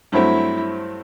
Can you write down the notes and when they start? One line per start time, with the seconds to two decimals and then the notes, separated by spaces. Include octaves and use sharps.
0.12 G2 F#3 A3 C4 E4